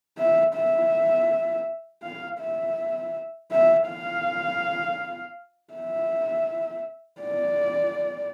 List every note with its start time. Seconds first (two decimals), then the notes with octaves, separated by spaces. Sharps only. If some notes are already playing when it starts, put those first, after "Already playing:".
0.18 E5
0.55 E5
2.03 F5
2.40 E5
3.51 E5
3.89 F5
5.74 E5
7.22 D5